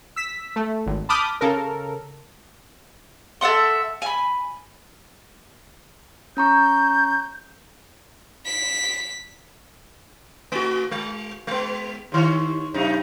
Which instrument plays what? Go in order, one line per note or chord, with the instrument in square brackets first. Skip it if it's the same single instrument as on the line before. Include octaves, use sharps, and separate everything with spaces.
[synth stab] E6 B6
A3
G#1
A5 B5 D6 D#6 F6 G6
C#3 A4 A#4
[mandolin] A4 E5 F#5 C6
G#5 B5
[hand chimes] C#4 A#5 C#6 [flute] G6
[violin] B6
[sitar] A3 F#4
G#3
G#3 B3
D#2 D#3 C#5
F#2 C3 D#4